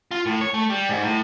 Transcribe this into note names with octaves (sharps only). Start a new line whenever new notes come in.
F4
A2
C#5
A3
G3
G#2
A2